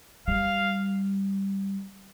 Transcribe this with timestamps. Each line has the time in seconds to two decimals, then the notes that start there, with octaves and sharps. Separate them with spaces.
0.28 G3 F5